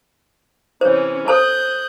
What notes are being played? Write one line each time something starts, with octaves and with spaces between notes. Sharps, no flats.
C3 E3 C#4 C5 C#5
A4 C5 A5 D#6 F#6 G6